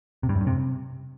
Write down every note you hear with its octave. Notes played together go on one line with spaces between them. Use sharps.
C3
G2
F#2
G2
C3